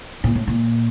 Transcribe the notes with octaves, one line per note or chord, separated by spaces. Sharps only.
A#2
A2
A#2